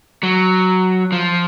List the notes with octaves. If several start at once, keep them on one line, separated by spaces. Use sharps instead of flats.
F#3
F3